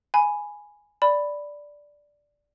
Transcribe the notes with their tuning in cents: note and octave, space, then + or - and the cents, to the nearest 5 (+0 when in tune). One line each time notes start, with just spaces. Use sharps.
G#5 +0 B5 +0
D5 +0 B5 +0